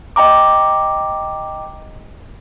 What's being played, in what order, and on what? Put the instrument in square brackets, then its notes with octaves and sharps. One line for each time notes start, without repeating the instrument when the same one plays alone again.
[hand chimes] D#5 G5 A#5 D6